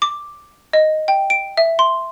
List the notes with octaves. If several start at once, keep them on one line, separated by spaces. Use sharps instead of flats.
D6
D#5
G5
D7
E5
C6